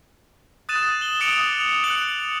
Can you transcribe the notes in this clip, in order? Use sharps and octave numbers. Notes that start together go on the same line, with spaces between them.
D#6 F#6 A6 D#7 E7
F#7 G7
D6 D#6 C#7 D7 F7
F7
F#6 C#7 F#7